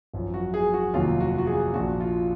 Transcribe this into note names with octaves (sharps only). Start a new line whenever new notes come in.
G#1 F#2 F3
F#4
G#4
F#4
F1 D#2 D#3 F#3 F4
F#4
F#4
G#4
A#1 A#2 F3 F#4
F4